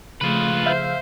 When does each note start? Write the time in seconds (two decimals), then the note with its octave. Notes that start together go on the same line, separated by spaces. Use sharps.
0.21 C#3 F3 A3 F4 G#4 B4
0.66 C5 E5 F5 G6